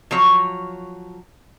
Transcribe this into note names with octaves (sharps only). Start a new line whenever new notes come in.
F3 F#3 C#5